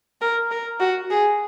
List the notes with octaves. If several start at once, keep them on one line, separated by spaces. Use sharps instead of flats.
A#4
A#4
F#4
G#4